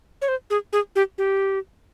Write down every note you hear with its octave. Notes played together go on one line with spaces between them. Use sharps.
C#5
C5
G#4
G#4
G4
G4